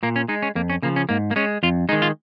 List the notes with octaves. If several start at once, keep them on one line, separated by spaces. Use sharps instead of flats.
A#2 A#3
C#4
G#3 D#4
C#4
F2 A#3
C#4
C#3 F3 A#3
C#4
G#2 A#3
A#3
G#3 C#4
F2 F4
D#3 G#3 D#4
F4